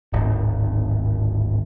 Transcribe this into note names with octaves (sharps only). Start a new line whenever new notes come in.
D1 G#1 D#3